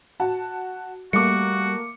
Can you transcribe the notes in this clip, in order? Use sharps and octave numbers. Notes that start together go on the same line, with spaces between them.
F#4 A5
G3 A3 A#3 F#4 D6 C#7